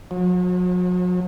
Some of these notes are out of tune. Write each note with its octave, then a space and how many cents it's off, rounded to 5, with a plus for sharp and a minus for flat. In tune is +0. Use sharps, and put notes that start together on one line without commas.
F#3 -40